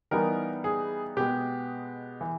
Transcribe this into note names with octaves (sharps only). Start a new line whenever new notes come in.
E3 G3 B3 D#4 A#4
G#4
B2 G#3 B3 G4
E3